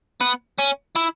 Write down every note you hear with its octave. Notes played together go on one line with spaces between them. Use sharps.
B3
C#4
E4